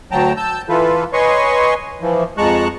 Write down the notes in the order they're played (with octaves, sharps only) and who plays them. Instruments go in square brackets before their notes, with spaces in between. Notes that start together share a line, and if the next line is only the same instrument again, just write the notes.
[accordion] D2 F#3 G5 A5 A#5
A5 E6 G6
E3 F4 A4 B4
B4 C#5 D#5 G#5 C6 C#6
E3 F3
F2 G#3 A5 A#5 C#6 F#6